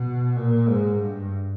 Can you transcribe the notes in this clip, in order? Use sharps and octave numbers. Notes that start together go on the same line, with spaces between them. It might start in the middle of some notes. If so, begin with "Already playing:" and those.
Already playing: B2
A#2
G#2
G2